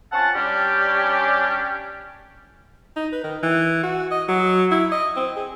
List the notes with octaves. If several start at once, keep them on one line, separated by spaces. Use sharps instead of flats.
C4 C#4 F4 F#5 A5
G3 C#4 D4 G4
D#4
B4
D#3
E3
F#4
D#5
F#3
E4
D#5
C4
G#4